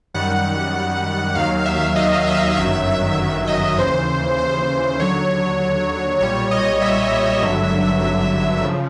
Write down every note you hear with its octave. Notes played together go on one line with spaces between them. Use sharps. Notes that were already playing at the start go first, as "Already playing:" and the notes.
F#2 D#3 G3 F#5
D#2 D#3 F#3 F5
E5
D#5
E5
G1 F#2 D#3 F#3 E5
E5
E5
D#5
D#2 C#3 E3 C5
C5
D#2 D3 F#3 C#5
B1 A#2 G3 C#5
D#5
E5
G#1 G2 D3 F#3
C#3 F3